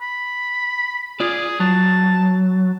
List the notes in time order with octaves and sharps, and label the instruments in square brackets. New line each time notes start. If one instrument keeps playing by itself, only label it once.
[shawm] B5
[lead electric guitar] F4 D5 [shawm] G#4
[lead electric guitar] F#3 [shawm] A5